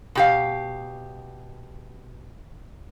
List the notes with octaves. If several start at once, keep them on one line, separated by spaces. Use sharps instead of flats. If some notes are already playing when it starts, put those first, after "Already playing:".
B2 G4 F5